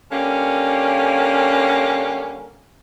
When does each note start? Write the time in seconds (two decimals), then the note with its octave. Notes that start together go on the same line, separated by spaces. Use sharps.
0.10 D3 G3 A#3 C#4